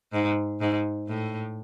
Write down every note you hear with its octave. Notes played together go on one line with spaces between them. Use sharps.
G#2
G#2
A2